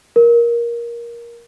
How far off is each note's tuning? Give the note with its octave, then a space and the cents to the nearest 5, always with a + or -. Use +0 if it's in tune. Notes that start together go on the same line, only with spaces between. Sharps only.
A#4 +15